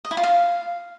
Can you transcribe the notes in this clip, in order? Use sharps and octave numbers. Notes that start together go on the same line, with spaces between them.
D#5
E4
F4
F5